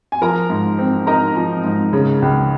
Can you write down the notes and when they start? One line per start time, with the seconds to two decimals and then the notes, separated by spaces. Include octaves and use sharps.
0.12 G#5
0.21 F3 A#4 A#5
0.50 G#2
0.79 C4
1.07 D#4 A#4 A#5
1.36 F3
1.64 G#2
1.93 C#3
2.22 C#2